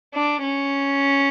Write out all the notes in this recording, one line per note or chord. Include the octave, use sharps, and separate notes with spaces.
D4
C#4